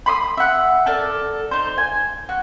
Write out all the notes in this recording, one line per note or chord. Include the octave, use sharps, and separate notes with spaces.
B5 C6 D6 D#6
E5 F#5
A4 A#4 D5
D#4 C5
G#5
F#4